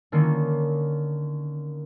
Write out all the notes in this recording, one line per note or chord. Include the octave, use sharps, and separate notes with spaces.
D3 D#3 A#3 C#4